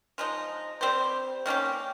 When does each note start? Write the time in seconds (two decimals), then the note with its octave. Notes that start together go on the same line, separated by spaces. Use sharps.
0.18 F3 G#3 D#4
0.81 G3 C4 G4 C5
1.46 D#3 A#3 C#4 G4